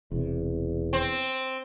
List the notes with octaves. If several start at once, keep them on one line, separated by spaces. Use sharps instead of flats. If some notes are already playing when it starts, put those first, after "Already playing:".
E1 E2 C3
C4